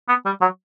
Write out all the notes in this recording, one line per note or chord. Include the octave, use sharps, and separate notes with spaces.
B3
G3
F#3